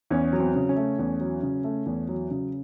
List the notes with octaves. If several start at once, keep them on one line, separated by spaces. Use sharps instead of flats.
E2 C#4
F#3
C4
C#3
C#4
A3
E2
F#3
C#3
A3
E2
F#3
C#3